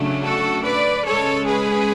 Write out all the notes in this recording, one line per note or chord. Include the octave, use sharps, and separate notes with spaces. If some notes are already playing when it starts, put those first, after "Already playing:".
Already playing: C#3 F#3 A3 D4
F#4 A4
B4 D5
C#3 G#3 C#4 A4 C#5
G#4 B4